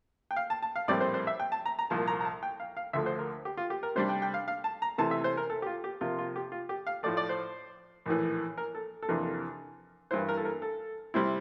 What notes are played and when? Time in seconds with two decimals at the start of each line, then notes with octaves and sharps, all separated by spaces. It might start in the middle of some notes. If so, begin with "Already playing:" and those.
0.31 G5
0.36 F5
0.50 A5
0.62 A5
0.76 F5
0.88 A#1 A2 G3 C4 E4 D5
1.00 C5
1.14 C5
1.27 E5
1.40 G5
1.52 A5
1.66 A#5
1.79 A#5
1.90 C2 A#2 F3 A5
2.07 A#5
2.20 A#5
2.25 A5
2.43 G5
2.60 F5
2.77 F5
2.93 D2 D3 F3 A3 E5
3.06 C5
3.19 A#4
3.45 G4
3.57 F4
3.70 G4
3.83 A#4
3.96 C3 G3 D4 C5
4.09 G5
4.22 G5
4.34 F5
4.48 F5
4.64 A5
4.82 A#5
4.98 C3 E3 A3 A5
5.11 E5
5.24 C5
5.37 A#4
5.50 A4
5.62 G4
5.66 F4
5.84 G4
6.01 C3 F3 A#3 F4
6.18 F4
6.36 G4
6.52 F4
6.69 G4
6.87 F5
7.03 A2 F3 A3 D5
7.17 D5
7.29 C5
8.06 A#1 A2 E3
8.58 A#4
8.75 A4
9.02 A4
9.08 F2 C3 E3 A#3 D4 A#4
10.11 G2 E3 A#3 E4 C5
10.29 A#4
10.37 A4
10.45 A#4
10.62 A4
11.14 C3 G3 C4 E4